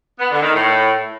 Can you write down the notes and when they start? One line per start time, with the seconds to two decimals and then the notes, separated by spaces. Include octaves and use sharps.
0.19 B3
0.30 D3
0.41 D#3
0.52 A2